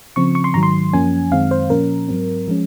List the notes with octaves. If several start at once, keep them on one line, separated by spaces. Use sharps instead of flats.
C#3 F3 C4 C#6
C#6
C6
G#2 D#3 F#3 A#5
C6
F#2 F3 A#3 C#4 G#5
F#2 D#3 G#3 C4 F5
C5
A#2 F3 A#3 C#4 A#4
G#2 F#3 C4
F3 G#3 C#4